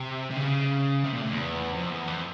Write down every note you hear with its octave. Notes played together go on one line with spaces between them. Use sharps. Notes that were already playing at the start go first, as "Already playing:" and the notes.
Already playing: C3
C3
C#3
C3
A#2
A2
E2
F2
E2
F2